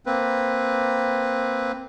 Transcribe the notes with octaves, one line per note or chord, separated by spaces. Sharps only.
A#3 C4 B4